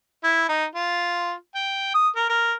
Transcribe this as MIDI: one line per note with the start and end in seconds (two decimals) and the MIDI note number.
0.24 0.45 64
0.49 0.65 63
0.75 1.33 65
1.55 1.89 79
1.94 2.09 87
2.16 2.29 70
2.30 2.53 70